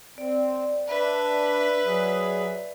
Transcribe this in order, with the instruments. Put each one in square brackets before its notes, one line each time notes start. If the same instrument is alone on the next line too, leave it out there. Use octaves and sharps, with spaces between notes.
[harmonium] C4 [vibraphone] D5
[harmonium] D4 [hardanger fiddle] B4 E5
[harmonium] F#3 G#4